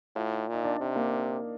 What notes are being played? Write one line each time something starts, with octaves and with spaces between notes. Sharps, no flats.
A2 F4
D#4
A#2 D#4
D4
C3 D4
A#3